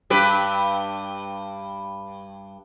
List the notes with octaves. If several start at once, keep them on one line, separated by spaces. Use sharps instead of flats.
G2 G4 B4